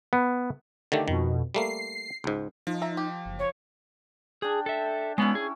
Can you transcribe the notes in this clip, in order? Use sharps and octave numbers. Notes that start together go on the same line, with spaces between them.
B3
D3 D#3 A3 G4
F2 B2 D#3
G3 A3 A#3 C7
C#2 G#2
F3 D#4
E5 A#5
G4
F#1
C#5
D4 G4 G#4
A4 E5
G#3 B3 C#4 E4
G#4